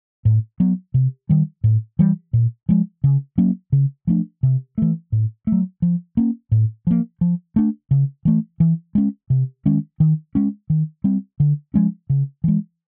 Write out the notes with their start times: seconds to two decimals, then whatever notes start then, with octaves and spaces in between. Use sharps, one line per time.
0.25 A2
0.60 F#3 B3
0.94 C3
1.29 D#3 G3
1.64 A2
1.99 E3 G3
2.33 A#2
2.69 F3 G#3
3.04 C#3
3.38 F#3 A#3 C#4
3.72 C#3
4.07 F3 A3 D4
4.43 C3
4.78 E3 A3
5.12 A2
5.47 A3
5.52 F#3
5.82 F3
6.17 A#3 C#4
6.52 A2
6.87 F3 A#3
7.21 F3
7.56 A3 D4
7.91 C#3
8.25 E3 A3
8.60 E3
8.95 G#3 C#4
9.30 C3
9.65 D#3 G#3 C#4
10.00 D#3
10.35 G#3 C#4
10.70 D#3
11.04 G3 C4
11.40 D3
11.74 F3 G#3 C#4
12.10 C#3
12.44 E3 G#3